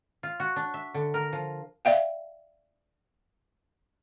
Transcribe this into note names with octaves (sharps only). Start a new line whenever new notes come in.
F4
F#4
D4
E5
D3
A#4
F3
D5 E5 F5 G5